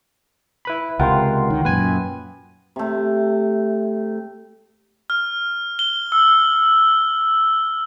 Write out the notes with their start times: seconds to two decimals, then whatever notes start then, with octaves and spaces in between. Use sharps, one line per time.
0.65 E4 B4 B5
0.99 C#2 C3 F4 A#4 F#5 G5 C6
1.50 D#3
1.65 F#2 A#2 B4 G#5
2.76 C3 A3
5.10 F6
5.79 G7
6.12 E6